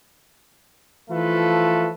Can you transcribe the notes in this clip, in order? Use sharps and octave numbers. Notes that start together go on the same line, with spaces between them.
E3 F3 A3 F4 A4 B4